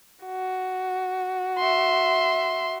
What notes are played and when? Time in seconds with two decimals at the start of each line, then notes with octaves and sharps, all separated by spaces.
0.25 F#4
1.58 E5 C6